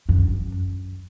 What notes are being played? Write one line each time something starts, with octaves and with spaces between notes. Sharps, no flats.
F#2